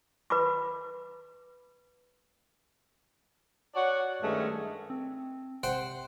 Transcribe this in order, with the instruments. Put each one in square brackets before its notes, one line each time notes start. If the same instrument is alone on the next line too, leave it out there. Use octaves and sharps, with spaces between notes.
[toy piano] B4 B5 D6
[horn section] F#4 C#5 D5 F#5
G2 D#3 G#3 A3 C#4
[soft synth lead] C4
[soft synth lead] C3 [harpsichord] C5 F#5 G5